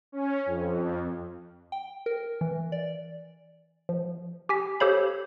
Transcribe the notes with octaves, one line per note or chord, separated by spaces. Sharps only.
C#4
F2
G5
A#4
E3
D5
F3
G4 G#5 B6
G4 A4 C5 C#5 F5 B5